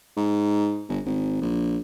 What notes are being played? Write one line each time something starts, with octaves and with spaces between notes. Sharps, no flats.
G#2
G1
G#1
A#1